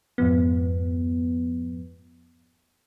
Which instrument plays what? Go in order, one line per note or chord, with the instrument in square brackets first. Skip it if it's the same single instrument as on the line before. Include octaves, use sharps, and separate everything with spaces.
[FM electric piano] F2 G#2 F3 B3